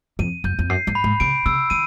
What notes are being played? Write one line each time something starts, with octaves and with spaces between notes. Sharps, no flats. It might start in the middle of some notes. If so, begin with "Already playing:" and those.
F2 D#7
F#2 G6
F2
F#2 C7
G2
B5
G#2
C#3 D7
C#3 E6
D#3 D#7